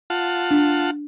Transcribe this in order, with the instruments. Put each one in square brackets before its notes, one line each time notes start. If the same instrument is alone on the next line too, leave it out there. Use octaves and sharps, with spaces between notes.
[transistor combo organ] F4 F#5 A5
[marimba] D4